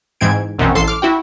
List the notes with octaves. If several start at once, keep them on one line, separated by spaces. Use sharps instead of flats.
G#2 E3 C4 G#6 D7
A#1 F#2 B2 E3 C4 C#4
A1 A4 C6 C7
D6 F6
E4 F#4 G5